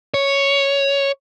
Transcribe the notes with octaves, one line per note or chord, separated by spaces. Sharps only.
C#5